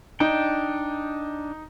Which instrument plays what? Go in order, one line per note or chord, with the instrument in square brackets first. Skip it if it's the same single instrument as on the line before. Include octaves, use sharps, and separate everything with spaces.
[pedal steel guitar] D4 G5 [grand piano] D#4